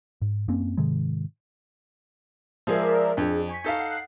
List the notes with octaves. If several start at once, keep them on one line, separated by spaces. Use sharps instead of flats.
G#2
F#2 A#3 C4 C#4
G#2 C3 D#3 G#3
F3 G#3 G#4 A#4 D5 E5
F2 D4 G#4
G#5 C#6 B6
D#4 A4 F5
F#5 C7